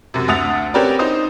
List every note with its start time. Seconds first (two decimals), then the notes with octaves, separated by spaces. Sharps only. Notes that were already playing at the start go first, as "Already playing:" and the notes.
0.14 F#2 C3
0.28 D2 E5 F#5 D#6 A6 F7
0.74 C4 C#4 G4 A#4 B4 D5
0.99 D#4 C5 D#6